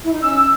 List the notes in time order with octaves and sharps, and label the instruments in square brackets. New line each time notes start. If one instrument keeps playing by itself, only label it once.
[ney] E4
D#4
[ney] C#4 [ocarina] E6